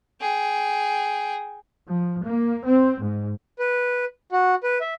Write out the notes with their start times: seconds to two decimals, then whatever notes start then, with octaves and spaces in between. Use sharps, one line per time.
0.21 G#4 G5
1.89 F3
2.23 A#3
2.65 C4
3.03 G#2
3.59 B4
4.32 F#4
4.64 B4
4.81 E5